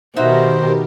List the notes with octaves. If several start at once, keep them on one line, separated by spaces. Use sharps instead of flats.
B2 D#3 D#4 F#4 G4 A#4 C5 E5